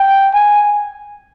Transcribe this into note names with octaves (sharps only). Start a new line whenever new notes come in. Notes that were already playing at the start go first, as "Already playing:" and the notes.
Already playing: G5
G#5